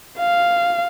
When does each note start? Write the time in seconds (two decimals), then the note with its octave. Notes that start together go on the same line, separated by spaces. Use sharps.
0.19 F5